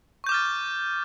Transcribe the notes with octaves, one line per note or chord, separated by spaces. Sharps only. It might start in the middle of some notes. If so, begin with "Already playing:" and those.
C#6 D6 F6 G6 A6